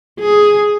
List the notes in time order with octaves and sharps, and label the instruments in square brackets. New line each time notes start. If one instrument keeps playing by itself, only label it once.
[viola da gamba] G#4